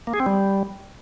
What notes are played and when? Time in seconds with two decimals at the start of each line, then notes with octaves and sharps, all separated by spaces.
0.07 A#3
0.14 G#4
0.20 C4
0.26 G3